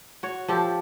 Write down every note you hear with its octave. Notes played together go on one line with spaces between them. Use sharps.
F#4 C#5
F3 G4 A4